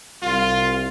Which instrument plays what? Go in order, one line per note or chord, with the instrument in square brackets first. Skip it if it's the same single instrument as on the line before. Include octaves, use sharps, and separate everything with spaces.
[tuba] C2 [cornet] F4